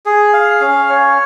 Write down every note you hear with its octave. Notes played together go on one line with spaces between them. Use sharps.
G#4
F5
C#4
C#5